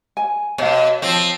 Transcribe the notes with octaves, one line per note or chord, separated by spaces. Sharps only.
G#5
B2 C#5 F5
F3 C4